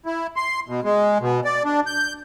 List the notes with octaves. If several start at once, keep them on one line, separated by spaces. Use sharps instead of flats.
E4
C6
B2
G#3
B2
D5
D4
G6